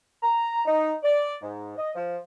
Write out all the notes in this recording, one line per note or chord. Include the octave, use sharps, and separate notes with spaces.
A#5
D#4
D5
G#2
D#5
F3